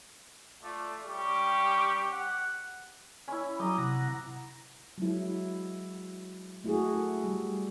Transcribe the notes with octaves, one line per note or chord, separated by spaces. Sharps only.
A3 F4 D5
G3 C#4 G4 C#6
F#5
C#4 E4 B5
F#3 G5 A#5 D6 D#6
C3 F#5 A#6
F#3 G#3 E4
A3 E4 F#4 G#4
G3